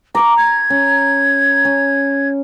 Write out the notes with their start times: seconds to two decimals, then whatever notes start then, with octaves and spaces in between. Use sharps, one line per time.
0.15 A#5 C#6 D6
0.37 G#6
0.70 C#4
1.65 C#4